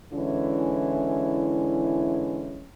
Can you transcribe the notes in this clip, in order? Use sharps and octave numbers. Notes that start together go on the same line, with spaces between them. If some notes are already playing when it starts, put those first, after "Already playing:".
D3 E3 G#3 C#4 E4